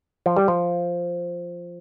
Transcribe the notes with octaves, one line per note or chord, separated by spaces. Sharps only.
F3
G3
F3